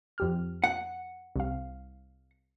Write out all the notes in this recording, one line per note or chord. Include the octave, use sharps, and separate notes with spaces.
F2 G4 F6
F#5
C2 F5